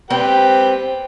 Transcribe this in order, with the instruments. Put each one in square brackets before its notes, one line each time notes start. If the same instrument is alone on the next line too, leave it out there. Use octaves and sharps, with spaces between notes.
[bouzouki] C4 [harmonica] G4 B4 G5